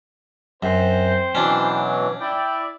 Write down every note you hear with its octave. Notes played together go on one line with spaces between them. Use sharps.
F#2 C4 C5
B2 E3 F#3 C#4 D4
E4 D5 G5